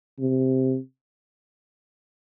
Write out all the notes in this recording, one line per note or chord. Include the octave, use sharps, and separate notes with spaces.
C3